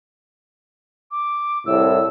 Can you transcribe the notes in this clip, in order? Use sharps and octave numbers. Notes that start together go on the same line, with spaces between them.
D6
C2 A2 E6